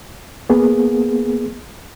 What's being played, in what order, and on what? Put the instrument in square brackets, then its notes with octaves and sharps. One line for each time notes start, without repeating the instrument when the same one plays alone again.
[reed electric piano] A#3 B3 G#4